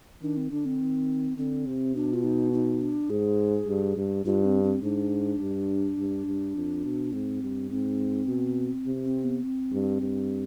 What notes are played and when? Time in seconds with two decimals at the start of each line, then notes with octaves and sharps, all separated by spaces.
0.22 D#3 D4
0.37 C4
0.51 D3 D4
0.65 C4
0.80 D#3
1.37 D3 C4
1.67 C3
1.95 B2 D4
2.13 F4
2.24 D#4
2.53 D#4
2.81 D4
3.10 G#2 G#4
3.68 G2
3.97 G2
4.25 G2 F4
4.44 C4
4.63 C4
4.83 G#2 D4
5.40 G2
5.98 G2
6.27 G2
6.56 F2
6.84 B2
7.13 G#2 C4
7.42 G2
7.70 G#2 C4
8.28 B2
8.86 C3
9.05 C4
9.24 B3
9.43 C4
9.72 G2
10.01 G2